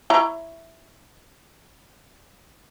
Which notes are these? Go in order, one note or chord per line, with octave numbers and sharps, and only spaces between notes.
E4 C#5 A#5